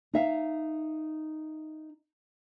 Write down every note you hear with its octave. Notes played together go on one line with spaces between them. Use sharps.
D#4 E5 F5